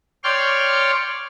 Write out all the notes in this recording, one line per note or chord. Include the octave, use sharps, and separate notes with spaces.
C#5 D5 G5 C6 C#6 F6